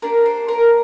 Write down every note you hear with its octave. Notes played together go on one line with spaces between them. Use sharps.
A#3 D4 G4 A#4
C5
A#4